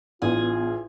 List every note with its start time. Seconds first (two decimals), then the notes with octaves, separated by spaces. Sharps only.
0.22 A1 B3 D4 F4 G#4